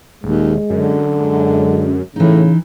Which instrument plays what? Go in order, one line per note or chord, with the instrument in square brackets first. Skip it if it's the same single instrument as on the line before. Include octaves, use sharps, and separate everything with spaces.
[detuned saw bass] D#1 [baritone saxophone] D#2 [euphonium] G#3
[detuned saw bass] F#2 [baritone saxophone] D3
[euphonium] G#3
[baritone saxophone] A2 [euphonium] C#3 [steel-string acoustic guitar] E3 D#4